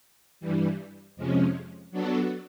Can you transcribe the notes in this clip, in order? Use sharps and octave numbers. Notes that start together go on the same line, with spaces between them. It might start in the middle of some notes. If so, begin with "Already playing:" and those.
G2 E3 G3
F2 C3 F3 G#3 C#4
F#3 B3 D4 F#4 A4